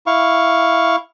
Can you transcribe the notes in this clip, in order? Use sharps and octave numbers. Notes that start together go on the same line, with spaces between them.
E4 F5 C#6